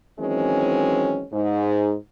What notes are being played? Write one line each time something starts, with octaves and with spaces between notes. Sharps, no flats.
D#3 E3 F#3 G#3 C4 C#4
G#2